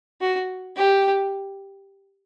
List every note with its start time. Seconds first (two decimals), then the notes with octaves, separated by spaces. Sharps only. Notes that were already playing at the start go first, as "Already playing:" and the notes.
0.21 F#4
0.76 G4